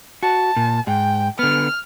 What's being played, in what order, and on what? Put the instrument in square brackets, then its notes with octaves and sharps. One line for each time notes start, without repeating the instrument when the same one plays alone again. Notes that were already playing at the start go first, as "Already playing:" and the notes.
[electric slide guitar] F#4 [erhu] A5
[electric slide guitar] A#2
[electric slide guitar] G#2 [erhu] G5
[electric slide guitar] D3 B3 [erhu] F6